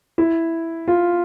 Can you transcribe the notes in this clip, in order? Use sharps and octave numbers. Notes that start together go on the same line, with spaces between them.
E4
F4